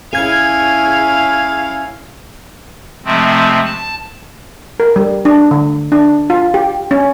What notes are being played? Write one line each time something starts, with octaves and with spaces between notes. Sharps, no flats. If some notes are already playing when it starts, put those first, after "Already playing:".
C#4 E4 G#4 F5 G#6
C3 F3 G#3 A3 C4
A5
A#4
G3
D4
D3
D4
F4
G4
C#4